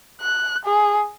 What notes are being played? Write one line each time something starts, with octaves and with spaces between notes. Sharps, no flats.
F#6
G#4